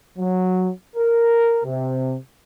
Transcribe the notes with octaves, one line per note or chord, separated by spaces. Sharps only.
F#3
A#4
C3